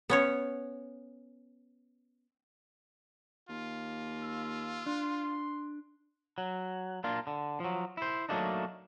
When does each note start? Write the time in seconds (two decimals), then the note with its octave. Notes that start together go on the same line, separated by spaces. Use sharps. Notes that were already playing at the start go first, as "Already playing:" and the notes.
0.10 B3 C#4 C#5
3.49 D#2 F4
4.22 E6
4.86 D4 C6
6.38 F#3
7.04 A#3 D4 F4
7.27 D3
7.60 F3 F#3
7.97 E4 C5
8.29 F#3 A3 A#3 D4 D#4